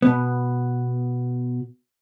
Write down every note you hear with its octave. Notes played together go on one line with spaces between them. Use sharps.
B2 B3